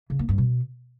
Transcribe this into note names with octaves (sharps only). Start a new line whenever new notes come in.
C#3
A#3
G2
B2